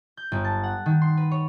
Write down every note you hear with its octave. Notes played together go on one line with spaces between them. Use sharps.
G6
G1
A5
F#5
D#3
C6
B4
C#5